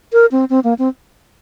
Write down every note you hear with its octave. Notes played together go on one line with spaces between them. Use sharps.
A#4
C4
C4
A#3
C4